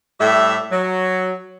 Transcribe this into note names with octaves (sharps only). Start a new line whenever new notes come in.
A2 G3 G4 E5
F#3